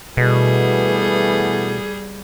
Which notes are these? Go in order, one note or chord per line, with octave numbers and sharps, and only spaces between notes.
B2 E3 G3 A3 B3 G#4